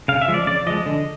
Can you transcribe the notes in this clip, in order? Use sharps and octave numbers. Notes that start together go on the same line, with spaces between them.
C#3 F5
E5
F3 G#3
D5
C#3 D5
F3 G#3 D#5
D3